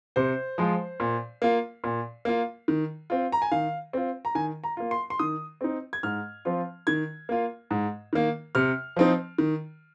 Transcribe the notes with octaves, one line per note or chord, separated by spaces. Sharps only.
C3 C5
F3 G#3 F4
A#2
A#3 F4
A#2
A#3 F4
D#3
C4 F4
A#5
G#5
D#3 F5
C4 F4
A#5
D#3 G#5
A#5
A#3 F4
C6
C6
D#3 D#6
C4 D#4
G#6
G#2 F6
F3 C4 F4
D#3 G#6
A#3 F4
G#2
D#3 A#3
C3 F6
F3 C4 D#4
D#3